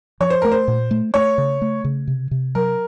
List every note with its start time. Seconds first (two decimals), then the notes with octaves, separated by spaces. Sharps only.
0.20 F3 C#5
0.30 C5
0.42 A3 A#4
0.52 C5
0.68 A#2
0.91 A3
1.14 A3 C#5
1.38 C#3
1.62 A3
1.85 C#3
2.07 C3
2.31 C3
2.55 F#3 A#4